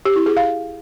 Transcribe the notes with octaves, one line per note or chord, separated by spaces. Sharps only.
G4
E4
G#4
F5